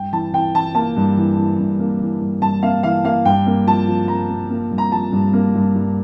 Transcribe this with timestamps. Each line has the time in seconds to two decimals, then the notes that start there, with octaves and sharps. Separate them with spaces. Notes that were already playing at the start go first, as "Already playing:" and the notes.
Already playing: G2 G5
0.13 E3 A5
0.33 E3 G5
0.55 E3 A5
0.75 A#3 A5
0.96 G2
1.17 E3
1.38 E3
1.59 G2
1.80 A#3
2.01 E3
2.21 G2
2.42 G2 A5
2.62 A#3 F5
2.83 E3 F5
3.04 A#3 F5
3.25 G2 G5
3.47 A#3
3.67 F3 A5
3.88 F3
4.08 A#3 A#5
4.29 A#3
4.50 A#3
4.71 G2
4.78 A#5
4.92 F3 A5
5.12 G2
5.33 A#3
5.55 G2
5.75 G2